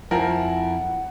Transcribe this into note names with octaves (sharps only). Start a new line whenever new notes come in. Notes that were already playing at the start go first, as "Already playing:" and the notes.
F2 F3 E4 A#4 F#5 G#5